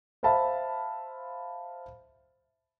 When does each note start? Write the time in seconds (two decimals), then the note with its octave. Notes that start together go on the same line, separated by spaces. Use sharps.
0.23 C5 E5 F5 A5 B5